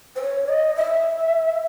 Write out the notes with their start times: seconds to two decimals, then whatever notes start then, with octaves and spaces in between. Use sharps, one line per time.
0.16 C5
0.22 C#5
0.49 D#5
0.76 E5